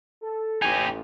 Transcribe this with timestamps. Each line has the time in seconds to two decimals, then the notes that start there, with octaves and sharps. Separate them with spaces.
0.22 A4
0.62 A1 D#4 G4 G#5